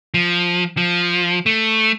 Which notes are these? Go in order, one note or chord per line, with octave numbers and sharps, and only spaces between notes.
F3
F3
A3